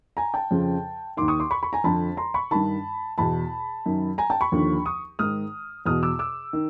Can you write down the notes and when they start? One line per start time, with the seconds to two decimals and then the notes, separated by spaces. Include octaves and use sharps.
0.17 G#5 A#5
0.34 G5 A5
0.51 F2 C#3 F3
1.17 D#2 D#3 C6 D6
1.28 C#6 D#6
1.40 C6 D6
1.51 B5 C#6
1.63 B5 C#6
1.73 G#5 A#5
1.84 F2 D3 F3 A5 B5
2.17 A#5 C6
2.34 B5 C#6
2.51 G2 D#3 A5 B5
3.18 E2 B2 A5 B5
3.86 F#2 D#3
4.18 G#5 A#5
4.30 G5 A5
4.41 B5 C#6
4.52 D#2 D3 F3
4.86 C#6 D#6
5.19 G#2 D#3 D#6 F6
5.86 E2 B2 D#6 F6
6.03 D6 E6
6.19 D6 E6
6.53 D#3